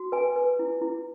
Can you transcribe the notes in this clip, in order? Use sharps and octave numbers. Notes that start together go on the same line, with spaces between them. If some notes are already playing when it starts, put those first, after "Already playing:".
Already playing: F#4
B4 G#5
B4
E4
E4